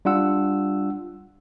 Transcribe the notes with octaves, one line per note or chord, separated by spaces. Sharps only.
G3 D4 F4 F#5 E6